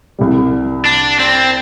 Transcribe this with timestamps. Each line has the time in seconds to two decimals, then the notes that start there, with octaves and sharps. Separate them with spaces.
0.19 C2 C3 G3
0.85 D4
1.19 C4